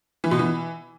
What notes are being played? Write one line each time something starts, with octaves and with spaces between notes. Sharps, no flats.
E3
B2
E3